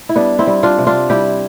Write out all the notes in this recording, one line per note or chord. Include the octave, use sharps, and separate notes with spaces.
E4
G3 B3 D4
C4 E4
G3
D4 F4
C3
D4 F4
G3 E4 G4